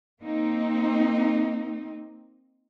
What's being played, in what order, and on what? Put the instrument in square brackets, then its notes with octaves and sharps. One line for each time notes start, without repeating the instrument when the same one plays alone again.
[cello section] A#3 C4 D#4